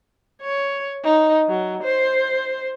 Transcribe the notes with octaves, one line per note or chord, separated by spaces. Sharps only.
C#5
D#4
F#3
C5